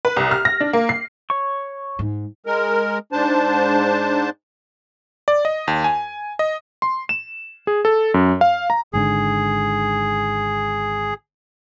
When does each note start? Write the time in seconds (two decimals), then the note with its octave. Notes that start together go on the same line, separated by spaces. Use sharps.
0.05 B4
0.16 C2
0.31 F6
0.45 A#6
0.60 D4
0.73 A#3
0.89 C7
1.30 C#5 C#6
1.99 G#2
2.46 G#3 A#4
3.12 G#2 D4 C5 A5
5.28 D5
5.45 D#5
5.68 D#2
5.84 G#5
6.39 D#5
6.82 C6
7.09 E7
7.67 G#4
7.85 A4
8.14 F#2
8.41 F5
8.70 A#5
8.93 G#1 G#2 D3 G#4